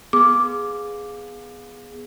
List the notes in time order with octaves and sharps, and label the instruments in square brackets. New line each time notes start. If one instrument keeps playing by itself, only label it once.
[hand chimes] B3 G#4 [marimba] D6